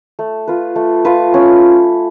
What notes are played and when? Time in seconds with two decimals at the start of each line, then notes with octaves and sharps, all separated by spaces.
0.19 A3
0.47 F4 B4
0.76 A3
1.05 F4 B4
1.34 C#4